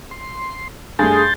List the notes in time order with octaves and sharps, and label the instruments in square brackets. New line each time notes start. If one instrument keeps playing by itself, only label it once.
[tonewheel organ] C6
[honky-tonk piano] G2 A3 [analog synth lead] G#4 [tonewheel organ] C6 G6 A6